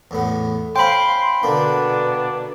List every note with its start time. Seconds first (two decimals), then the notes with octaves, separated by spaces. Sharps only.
0.11 E2 A2 B3
0.76 C#4 C5 F5 G5 B5 C6
1.43 B2 D3 A#3 B3 D4